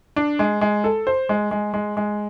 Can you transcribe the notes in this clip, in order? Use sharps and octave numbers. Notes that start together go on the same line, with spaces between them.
D4
G#3
G#3
A4
C5
G#3
G#3
G#3
G#3